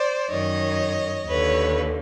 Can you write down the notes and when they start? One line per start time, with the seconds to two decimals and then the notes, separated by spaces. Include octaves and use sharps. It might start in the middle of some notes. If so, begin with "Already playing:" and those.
Already playing: C5 D5
0.30 F#2 D#3 C#5 D#5
1.27 D#2 D3 B4 C#5